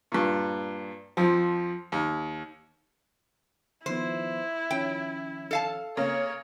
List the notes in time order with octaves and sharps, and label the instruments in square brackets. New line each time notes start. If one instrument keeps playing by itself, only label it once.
[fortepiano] G2 A#2
F2 F3
D#2
[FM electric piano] D#3 F3 B3 [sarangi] E4 [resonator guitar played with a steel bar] C5
[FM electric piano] D#3 F3 C#4 [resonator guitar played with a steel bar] G5
[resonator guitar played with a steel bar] A4 F5 A5
[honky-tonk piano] C#3 A#3 [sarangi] C#5